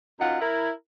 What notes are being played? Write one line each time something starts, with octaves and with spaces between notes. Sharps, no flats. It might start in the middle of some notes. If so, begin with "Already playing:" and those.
F#2 D#4 F4 F#5
E4 A#4